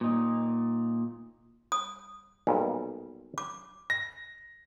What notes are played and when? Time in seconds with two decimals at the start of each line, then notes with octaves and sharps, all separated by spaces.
0.01 A#2 D#4
1.72 D#6
2.47 B1 A#2 G3
3.38 D6
3.90 A#6